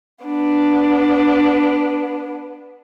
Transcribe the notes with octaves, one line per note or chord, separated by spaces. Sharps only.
B3 D4